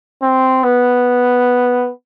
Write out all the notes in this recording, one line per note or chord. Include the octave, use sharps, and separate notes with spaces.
C4
B3